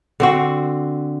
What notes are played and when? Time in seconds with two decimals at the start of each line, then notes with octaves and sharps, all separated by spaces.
0.20 D3 C4 F#4